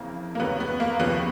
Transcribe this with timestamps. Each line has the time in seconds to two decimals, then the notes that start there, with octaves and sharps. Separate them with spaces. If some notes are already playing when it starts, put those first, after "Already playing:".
Already playing: F2 C#3 E3 A#3
0.35 A#3
0.40 F1 D#2 C#3 F#3 B3
0.60 B3
0.80 A#3
0.99 D#2 C#3 F3 B3